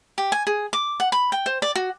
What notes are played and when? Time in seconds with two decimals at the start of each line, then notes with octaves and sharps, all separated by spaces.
0.18 G4
0.32 G#5
0.47 G#4
0.73 D6
1.00 F#5
1.12 B5
1.32 G5
1.46 C5
1.62 D5
1.76 F#4